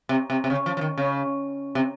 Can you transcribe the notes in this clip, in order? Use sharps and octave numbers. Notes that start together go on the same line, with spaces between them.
C3
C3
C3
C#3
F3
F3
D#3
C#3
C3